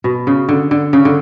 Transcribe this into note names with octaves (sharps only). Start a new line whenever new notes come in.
B2
C#3
D3
D3
C#3
D3